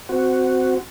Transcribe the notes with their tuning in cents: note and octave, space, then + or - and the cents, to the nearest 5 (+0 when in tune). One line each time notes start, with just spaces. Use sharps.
C4 -15 F#4 +0